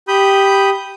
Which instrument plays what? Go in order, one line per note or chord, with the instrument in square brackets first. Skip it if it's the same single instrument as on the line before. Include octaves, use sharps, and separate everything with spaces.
[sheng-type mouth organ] G4 B5 D#6 G6